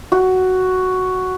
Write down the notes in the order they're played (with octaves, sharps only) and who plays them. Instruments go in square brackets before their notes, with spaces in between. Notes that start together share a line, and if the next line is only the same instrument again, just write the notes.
[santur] F#4